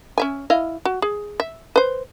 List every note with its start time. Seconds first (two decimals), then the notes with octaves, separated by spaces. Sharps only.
0.18 C#4 E5 G#5
0.50 E4 D#5 F5
0.85 F#4
1.02 G#4
1.40 E5
1.76 B4 C5